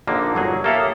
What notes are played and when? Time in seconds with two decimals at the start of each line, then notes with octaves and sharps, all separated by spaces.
0.07 A#1 D3 A#3 D#4
0.35 G1 F#3 G#4
0.64 A#3 G4 A4 C#5 E5 F5
0.78 D#6